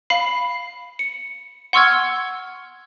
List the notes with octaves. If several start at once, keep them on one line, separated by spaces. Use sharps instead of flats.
F5 B5 C7
C#7
F#5 C6 C#6 E6 F6 G#6